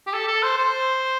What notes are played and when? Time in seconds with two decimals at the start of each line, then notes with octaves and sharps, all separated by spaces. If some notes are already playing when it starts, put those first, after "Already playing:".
0.07 G4
0.13 A4
0.28 A4
0.42 C5
0.57 C5